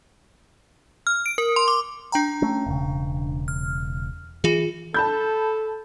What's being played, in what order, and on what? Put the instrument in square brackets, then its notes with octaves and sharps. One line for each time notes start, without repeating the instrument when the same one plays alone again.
[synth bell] F6
D7
A#4
C6
D6
D4 G5 A#5
[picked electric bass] A3 C#4
E1 C#3
[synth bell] F6
[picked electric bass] E3 [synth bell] F4 G#4
[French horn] A4 [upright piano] A5 B5 G6